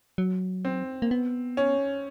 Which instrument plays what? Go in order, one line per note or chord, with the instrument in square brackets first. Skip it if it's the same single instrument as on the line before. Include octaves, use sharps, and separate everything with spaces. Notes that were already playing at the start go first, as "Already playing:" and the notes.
[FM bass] F#3
[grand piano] C4
[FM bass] A#3
B3
[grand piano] C#4